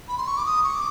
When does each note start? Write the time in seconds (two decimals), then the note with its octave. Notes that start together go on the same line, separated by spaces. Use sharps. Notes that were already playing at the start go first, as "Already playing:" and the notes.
0.09 B5
0.18 C6
0.27 C#6
0.37 D6
0.46 D#6
0.63 C#6
0.74 D6